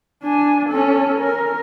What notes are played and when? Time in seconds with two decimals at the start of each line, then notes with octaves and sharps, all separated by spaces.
0.23 D4 G#5
0.69 C#4 A4
1.19 A#4